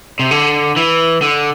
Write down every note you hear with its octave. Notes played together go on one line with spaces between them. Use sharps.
C3
D3
E3
D3